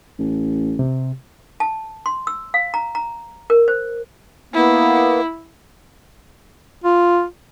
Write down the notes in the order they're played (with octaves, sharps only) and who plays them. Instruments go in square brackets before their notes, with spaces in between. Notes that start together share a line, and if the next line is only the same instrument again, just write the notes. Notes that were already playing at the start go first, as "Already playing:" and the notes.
[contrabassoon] A1
[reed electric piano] C3
[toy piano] A5
C6
E6
F5
A#5
A#5
A#4
C5
[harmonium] A#3 B3 [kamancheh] E4
[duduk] F4